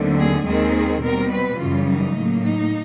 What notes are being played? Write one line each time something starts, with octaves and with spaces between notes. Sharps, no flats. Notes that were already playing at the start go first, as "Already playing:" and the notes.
Already playing: D#2 D3 F#3 A3 C4
G#4
D#2 D#3 G#3 C4 G#4
B2 G3 C4 A#4
B4
F#2 C#3 E3 G3 F4
D#4
A2 F#3 A#3
D#4